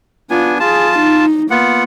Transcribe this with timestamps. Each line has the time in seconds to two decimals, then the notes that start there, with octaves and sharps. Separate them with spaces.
0.30 B3 D4 F4 G#5
0.60 F4 G#4 A5
0.98 D#4
1.51 A#3 B3 F4 F#5